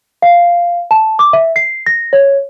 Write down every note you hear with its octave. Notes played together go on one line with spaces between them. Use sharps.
F5
A5
D6
E5
C7
A#6
C#5